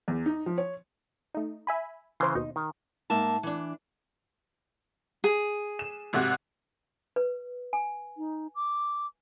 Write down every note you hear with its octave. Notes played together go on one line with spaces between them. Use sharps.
E2
D#4
F3
C#5
A3 D#4
E5 G#5 B5
C#3 E3 C5 C6
D#2 B2 D#4
D#3
G#2 A#3 E5 A5
E3 D4
G#4
E7
G#1 C3 F#4
B4
G#5
D#4
D6